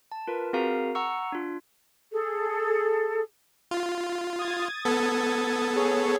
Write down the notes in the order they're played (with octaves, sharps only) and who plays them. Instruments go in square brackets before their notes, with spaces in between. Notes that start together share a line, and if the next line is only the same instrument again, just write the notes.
[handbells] A5
F4 A#4 B4
C4 F#4 G#4 A#4 F5 A#5
F#5 A#5 C#6 E6 C#7
D4 F4
[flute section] G#4 A4
[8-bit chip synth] F4
[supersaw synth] D#6 G#6 A6
[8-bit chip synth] B3 A4
[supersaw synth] G#4 C#5